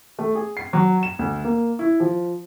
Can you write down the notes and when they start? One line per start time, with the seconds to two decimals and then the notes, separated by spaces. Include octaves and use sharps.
0.19 A3
0.35 G#4
0.57 C7
0.73 F#3
1.03 E7
1.19 D2
1.44 A#3
1.79 E4
2.00 F3